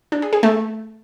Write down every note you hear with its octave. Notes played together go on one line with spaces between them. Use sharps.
D4
G#4
G#4
A3